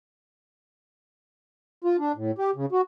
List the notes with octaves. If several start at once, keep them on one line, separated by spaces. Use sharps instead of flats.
F4
D4
A2
G4
C#3
F#4